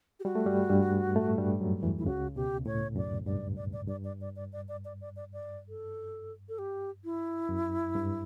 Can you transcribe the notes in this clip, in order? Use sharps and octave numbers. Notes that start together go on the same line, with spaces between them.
G4
G3 F#4
A3
G2 G3
G2 G3
A2 A3
G2 G3
F#2 F#3
E2 E3
E4
C#2 C#3 F#4
B2 G4
A2 C#5
F#2 D5
G2 D5
D5
D5
G2 D5
D5
D5
D5
D5
D5
D5
D5
D5
D5
A4
A4
G4
E4
F#2
G2